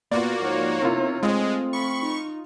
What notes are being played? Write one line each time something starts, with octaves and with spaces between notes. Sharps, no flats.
A#2 A#3 B3 F4 F#4 D5
G#2 F3 D#4 C#5
C3 A#3 B3 E4 F4
G#3 A3 C4 F4 D#6
B5 C#6
D#4